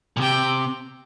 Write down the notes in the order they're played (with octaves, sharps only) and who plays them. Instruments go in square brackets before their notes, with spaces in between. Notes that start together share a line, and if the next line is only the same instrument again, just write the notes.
[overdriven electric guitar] A#2
[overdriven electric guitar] C3 [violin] G5